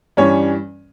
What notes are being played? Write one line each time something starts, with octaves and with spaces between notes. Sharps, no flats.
G2 E3 G3 C#4 C#5